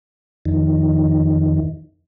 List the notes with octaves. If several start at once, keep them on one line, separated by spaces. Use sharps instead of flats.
F2 D#3